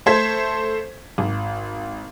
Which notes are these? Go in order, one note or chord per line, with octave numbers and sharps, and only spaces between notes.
A3 A4 C5 G#6 B6
G#1